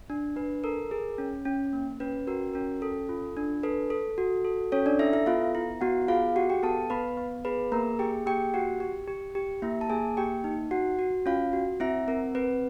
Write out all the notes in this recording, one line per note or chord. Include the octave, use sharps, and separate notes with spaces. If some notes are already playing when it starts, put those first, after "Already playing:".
D4
D4 B4
A4 A#4
G#4 A#4
C#4
C#4
A#3
C#4 B4
F#4 A#4
C#4 A#4
A4
F4
D4
A4 B4
A4
F#4
A4
C#4 A4 C#5
D4 D5
E4 A4 E5
E4 E5
B3 F4 F5
E4
B3 F#4 F#5
F4 G#4 F5
F#4 G4 F#5
G4 G5
B3 A4 A5
B3 B4 B5
B3
G#4 B4 B5
A#3 A#4 A#5
G4 G#4 G5
A#3 G4 G5
F#4 G4 F#5
G4
G4
G4
A#3 E4 E5
A5
A#3 G#4 G#5
A#3 G4 G5
D#4
F#4 F#5
F#4
C#4 F4 F5
F#4
C4 E4 E5
C4 A#4
C4 B4